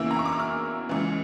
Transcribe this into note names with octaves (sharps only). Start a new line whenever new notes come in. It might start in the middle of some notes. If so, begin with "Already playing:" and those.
Already playing: E2 C#3 E3 A#3 E4 E6
A#5
C#6
D6
E6
F6
C#2 C#3 E3